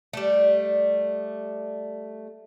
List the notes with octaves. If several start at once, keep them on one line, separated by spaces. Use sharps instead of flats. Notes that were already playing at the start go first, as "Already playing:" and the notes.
G3 A3